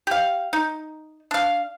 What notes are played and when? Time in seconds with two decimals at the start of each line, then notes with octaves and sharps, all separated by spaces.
0.07 G4 F5
0.53 D#4
1.31 D4 F5